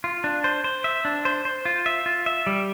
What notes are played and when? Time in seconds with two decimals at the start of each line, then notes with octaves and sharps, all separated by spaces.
0.04 F4
0.24 D4
0.44 C5
0.64 C5
0.84 E5
1.05 D4
1.25 C5
1.45 C5
1.65 F4
1.86 E5
2.06 F4
2.26 E5
2.47 G3